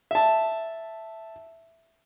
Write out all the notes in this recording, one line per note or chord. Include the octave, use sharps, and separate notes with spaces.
E5 A5